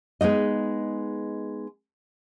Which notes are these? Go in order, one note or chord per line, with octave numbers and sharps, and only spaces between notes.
G#3 B3 D#4 D#5